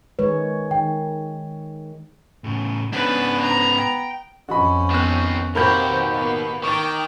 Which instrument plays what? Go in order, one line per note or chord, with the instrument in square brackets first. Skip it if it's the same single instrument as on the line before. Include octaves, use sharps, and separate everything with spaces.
[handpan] D#3 G#3 C#5 [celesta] B4
[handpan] D#3 [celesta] G5
[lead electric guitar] A2 C#3
[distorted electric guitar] G#2 C#3 [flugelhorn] B3 [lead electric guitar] D4 [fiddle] B4
[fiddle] A#5
[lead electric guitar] G5
[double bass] F2 C#4 [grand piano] F#4 D#5 B5
[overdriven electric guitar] D#3 C4 [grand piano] B3 F#6
[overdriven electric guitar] D#2 G4 [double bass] B2 [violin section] C4 F#4 [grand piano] A#4 B5 G6
[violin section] A#3 B3
[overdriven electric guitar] D#3 [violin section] G5 A#5 D6 [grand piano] C#6 A6